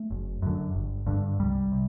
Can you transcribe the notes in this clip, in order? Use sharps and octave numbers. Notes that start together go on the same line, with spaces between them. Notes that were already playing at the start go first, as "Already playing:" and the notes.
Already playing: A3
F#1
F#2 D3
G1
G2 D3
C2 G3
C3